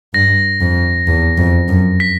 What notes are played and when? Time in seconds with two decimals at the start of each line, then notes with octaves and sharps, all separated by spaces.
0.14 G2 A#6
0.61 F2
1.07 E2
1.38 F2
1.69 F#2
2.00 B6